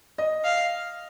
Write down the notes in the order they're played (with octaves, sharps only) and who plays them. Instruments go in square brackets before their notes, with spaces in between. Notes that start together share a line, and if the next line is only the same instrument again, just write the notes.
[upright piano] D#5
[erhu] F5